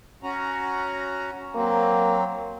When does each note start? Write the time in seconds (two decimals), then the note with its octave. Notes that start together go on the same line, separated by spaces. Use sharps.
0.23 C#4 F#4 A#5
1.55 F#3 A#3 C4